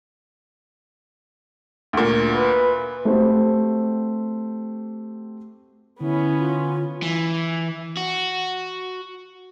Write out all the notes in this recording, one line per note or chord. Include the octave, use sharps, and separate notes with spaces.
D2 A#2
B4
A3 C4 F#4 G4 C5
D3 B3 C#4 E4
F4
E3
F#4